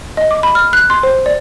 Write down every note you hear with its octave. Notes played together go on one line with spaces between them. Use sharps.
D#5
D6
B5
F6
F#6
C6
C5
D5